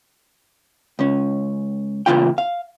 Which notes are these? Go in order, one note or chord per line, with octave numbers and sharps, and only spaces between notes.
C#2 C#4
E2 A#2 C#3 F4 G5
F5